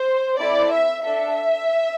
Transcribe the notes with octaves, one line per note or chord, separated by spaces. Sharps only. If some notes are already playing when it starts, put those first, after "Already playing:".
Already playing: C5
C4 E4 A4 D5
E5
D4 A4 E5